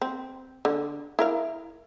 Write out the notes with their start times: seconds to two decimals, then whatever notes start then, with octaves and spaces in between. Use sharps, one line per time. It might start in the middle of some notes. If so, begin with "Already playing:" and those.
0.01 C4
0.65 D3
1.19 E4 A#4 F5